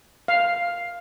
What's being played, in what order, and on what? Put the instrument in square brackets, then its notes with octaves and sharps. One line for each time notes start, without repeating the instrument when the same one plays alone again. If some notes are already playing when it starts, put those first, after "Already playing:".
[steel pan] F5